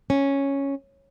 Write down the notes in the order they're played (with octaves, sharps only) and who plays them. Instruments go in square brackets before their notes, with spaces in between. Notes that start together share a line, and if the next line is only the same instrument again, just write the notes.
[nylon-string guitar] C#4